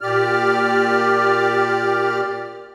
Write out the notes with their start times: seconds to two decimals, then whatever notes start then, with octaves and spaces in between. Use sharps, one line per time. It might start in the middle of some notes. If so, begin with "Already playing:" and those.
0.01 A#2 G4 D5 F6